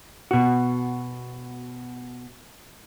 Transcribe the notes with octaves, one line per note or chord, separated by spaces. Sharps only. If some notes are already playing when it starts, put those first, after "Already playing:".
B2 F#4